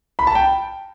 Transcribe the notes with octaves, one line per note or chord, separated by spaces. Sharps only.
B5
A5
G5